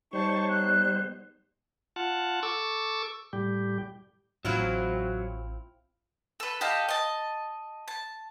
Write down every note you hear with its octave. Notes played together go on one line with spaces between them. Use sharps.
G3 D#4 C5 C#5 A5 C#6
B3 F#6
F4 F#5 A5
A4 C#6 D6 E6
A2 G3 G4
A1 F#3 C4 E4 F4
A4 B4
G4 A4 D#5 F5
D#5 A5
A5